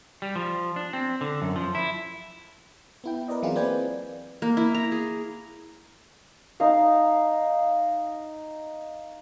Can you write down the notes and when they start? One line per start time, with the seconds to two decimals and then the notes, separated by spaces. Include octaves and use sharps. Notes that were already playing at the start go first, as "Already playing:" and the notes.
0.22 G3
0.36 F3
0.76 D4
0.93 C4
1.21 D3
1.42 F#2
1.56 F3
1.75 E4
3.04 B3 E4 G5
3.28 A#4 B4 D5 D#5
3.43 E3 F#3 C4 E4 F4 G#4
3.55 A#3 C4 B4 D5 G5 G#5
4.42 A#3
4.57 E4
4.74 A#5
4.92 G#4
6.60 D#4 F5